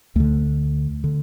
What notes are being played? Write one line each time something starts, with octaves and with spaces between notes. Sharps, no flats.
D2 D3 A3
D3